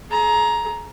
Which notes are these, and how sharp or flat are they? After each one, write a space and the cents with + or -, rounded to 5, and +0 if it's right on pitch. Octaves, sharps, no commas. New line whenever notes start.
G#4 +40 A#5 +10